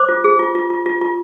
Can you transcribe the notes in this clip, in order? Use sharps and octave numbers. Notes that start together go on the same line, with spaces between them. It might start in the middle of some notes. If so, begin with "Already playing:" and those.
Already playing: C5 D6
F4
G#4
F4
F4
F4
F4
F4